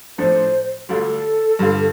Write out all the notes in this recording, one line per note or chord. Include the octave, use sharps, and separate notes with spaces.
A2 F3 D4 A4 C5
D2 D3 G3 D4 F4 A4
G2 D3 G3 D4 F4